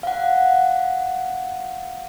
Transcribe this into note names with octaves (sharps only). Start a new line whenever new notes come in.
F5 F#5